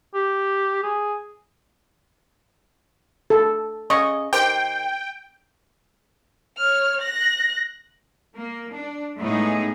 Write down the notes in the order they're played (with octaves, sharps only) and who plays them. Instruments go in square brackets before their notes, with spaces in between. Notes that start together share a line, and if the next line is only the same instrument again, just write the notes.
[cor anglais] G4
G#4
[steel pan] A4
[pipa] C#3 D#5 [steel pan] C#6
[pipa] D#3 G4 C5 [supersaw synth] G5
[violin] C#5 F6
F#6 A#6
[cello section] A#3
D4
A2 G#3 A3 B3 D#4 G#4